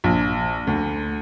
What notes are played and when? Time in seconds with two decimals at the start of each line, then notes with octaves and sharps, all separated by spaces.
0.04 A#1
0.67 D2